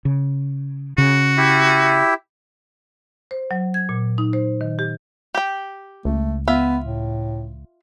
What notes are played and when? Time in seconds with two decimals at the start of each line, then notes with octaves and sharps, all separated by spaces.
0.05 C#3
0.98 C#3 F#4
1.38 E4 G4 E5
3.31 C5
3.51 F#3
3.74 G#6
3.89 A#2
4.18 D#4
4.33 C5
4.61 D#3
4.79 G4
5.35 G4 G5
6.05 C#2 A3
6.48 B3 F4 E5
6.84 A2